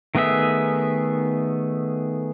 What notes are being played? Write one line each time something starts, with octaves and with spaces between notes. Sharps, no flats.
D#3 A3 B3 G#4 E5